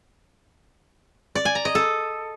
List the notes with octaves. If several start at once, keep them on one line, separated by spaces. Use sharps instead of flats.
D5
G#5
A#5
D#5
A4